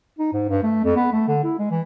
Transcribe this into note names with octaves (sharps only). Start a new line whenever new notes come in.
D#4
G#2
G2
A3
F2
B3
A3
D3
E4
G#3
E3